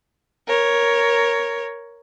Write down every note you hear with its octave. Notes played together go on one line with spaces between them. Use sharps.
A#4 C#5